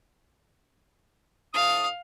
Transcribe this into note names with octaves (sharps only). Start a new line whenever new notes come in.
A2 F5 A5 D#6